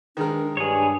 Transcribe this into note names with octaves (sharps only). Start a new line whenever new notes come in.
D#3 G#3 D4 A#4
G2 D4 G#4 C#5